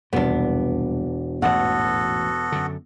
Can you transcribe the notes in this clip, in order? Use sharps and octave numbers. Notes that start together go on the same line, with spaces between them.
E1 C2 F2 G#2 B3 D4
A1 G#2 B3 F#4 A4 F#5
F#2 D3